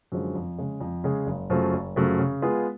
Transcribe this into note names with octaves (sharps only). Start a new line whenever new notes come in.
F#2 D3 F3 G#3
F2
C#3 G#3
F2
C#3 G#3
F#1
F#2 C#3 F3 A3
F#1
F#2 C#3 F3 A3
C#3
G#3 B3 F4 G#4